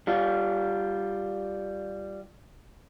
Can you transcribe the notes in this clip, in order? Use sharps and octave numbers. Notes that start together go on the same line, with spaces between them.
G3 F4